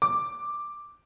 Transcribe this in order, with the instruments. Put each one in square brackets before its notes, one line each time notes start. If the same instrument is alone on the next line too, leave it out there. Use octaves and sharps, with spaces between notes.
[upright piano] D6